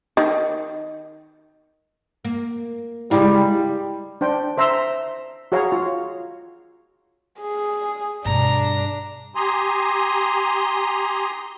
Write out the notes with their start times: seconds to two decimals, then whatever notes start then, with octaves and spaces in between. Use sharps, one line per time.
0.17 D#3
2.25 A#3
3.11 C#3 G3 G#3 E4 F5
4.21 D4 C5 G5
4.57 C5 E5 A#5 C6 E6
5.52 F#4 G#4 C#5 F5 A#5
5.72 F4
7.41 G#4
8.25 G2 B2 D4 A#5
9.35 G4 G#5 A#5 C6 D#6